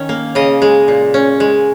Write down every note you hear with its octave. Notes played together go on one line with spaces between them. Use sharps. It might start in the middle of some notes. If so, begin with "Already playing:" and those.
Already playing: D#3 C#4
A#3
C#3 D#5
G#3
A#2
C#4
G#3